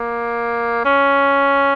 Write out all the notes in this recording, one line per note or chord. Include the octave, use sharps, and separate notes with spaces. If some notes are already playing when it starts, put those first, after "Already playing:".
Already playing: A#3
C#4